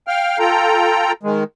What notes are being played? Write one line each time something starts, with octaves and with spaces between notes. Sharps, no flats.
F5 G5 F6
F4 A4 G5 A#5
D#3 G#3